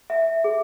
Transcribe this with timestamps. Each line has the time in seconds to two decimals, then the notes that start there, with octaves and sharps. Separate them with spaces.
0.10 E5
0.44 G#4